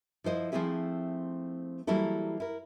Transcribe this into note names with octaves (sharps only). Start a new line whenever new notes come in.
F3 E4 C5 D#5
F3 A3 C4 E4 G#4 E5
E3 F#3 G3 A#3 E4 A4
E4 A#4